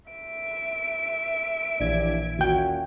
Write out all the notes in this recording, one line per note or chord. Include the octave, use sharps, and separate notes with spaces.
E5 D7
A#1 D#2 E3 D4 D5 G#6
D#2 A#2 C#4 F#4 G5